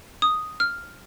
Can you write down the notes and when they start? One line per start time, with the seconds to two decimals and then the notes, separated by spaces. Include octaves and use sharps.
0.22 D#6
0.60 F6